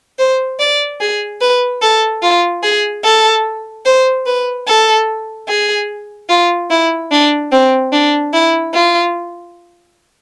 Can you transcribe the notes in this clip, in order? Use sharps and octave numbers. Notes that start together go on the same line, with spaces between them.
C5
D5
G#4
B4
A4
F4
G#4
A4
C5
B4
A4
G#4
F4
E4
D4
C4
D4
E4
F4